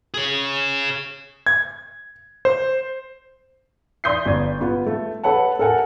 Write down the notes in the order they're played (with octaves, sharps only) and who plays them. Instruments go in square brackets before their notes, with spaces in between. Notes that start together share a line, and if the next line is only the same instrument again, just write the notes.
[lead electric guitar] G#4 C#5
[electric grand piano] G#6
C5
[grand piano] D5 C6 D#6 G6 B6 C7
G1 D5 G#6
B3 F4
A3
A4 B4 C#5 F#5 A5
A4 A#4 F#5 G#5 A5